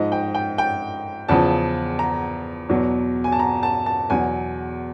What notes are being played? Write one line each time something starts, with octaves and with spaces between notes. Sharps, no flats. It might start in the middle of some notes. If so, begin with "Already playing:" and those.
Already playing: G#2 F3 D#5
G5
G5
G5
E2 C#3 F3 A5
A#5
E2 B2 F#3
G#5
A5
A#5
A5
A5
E2 B2 F#3 G#5